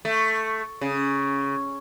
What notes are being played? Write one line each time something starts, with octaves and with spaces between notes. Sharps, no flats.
A3
C#3